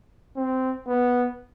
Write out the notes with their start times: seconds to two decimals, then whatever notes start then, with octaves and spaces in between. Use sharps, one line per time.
0.37 C4
0.88 B3